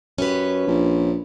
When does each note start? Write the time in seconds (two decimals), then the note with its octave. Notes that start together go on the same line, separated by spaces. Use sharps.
0.18 F#2 C#4 G4 B4
0.67 A#1